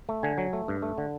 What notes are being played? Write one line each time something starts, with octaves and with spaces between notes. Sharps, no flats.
A3
D3 G#5
F#3
A3
G2
A3
D3